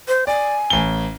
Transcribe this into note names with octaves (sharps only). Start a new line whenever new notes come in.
C5
D5 G#5
A1 G7